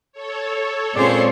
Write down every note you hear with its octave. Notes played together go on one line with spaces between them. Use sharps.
A4 C#5
A#2 G#3 C4 C#4 C5 D5